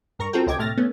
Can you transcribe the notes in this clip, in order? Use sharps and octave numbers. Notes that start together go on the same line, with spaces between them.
G2 A#4 A#5 C#6
C4 F4 F#4 A4 A#4 G5
C#2 C3 D#5 G5 D6 G#6
A2 C3 A3 F6 A6 A#6
A3 B3 C#4